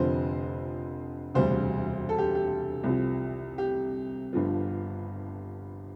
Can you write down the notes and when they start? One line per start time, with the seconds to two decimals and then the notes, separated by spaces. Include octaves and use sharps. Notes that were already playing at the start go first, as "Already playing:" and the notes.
Already playing: F1 F2 D3 F3 C5
1.35 E1 D2 C3 G3 C5
2.09 A4
2.18 G4
2.35 G4
2.84 C2 C3 F3
3.58 G4
4.33 G1 G2 D3 F3